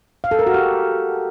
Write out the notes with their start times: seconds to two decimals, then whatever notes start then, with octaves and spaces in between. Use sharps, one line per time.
0.24 F5
0.31 A4
0.39 A#4
0.47 F#4
0.54 G4